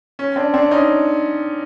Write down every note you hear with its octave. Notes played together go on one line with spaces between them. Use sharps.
C#4
C4 D4
C4 D4
C#4 D#4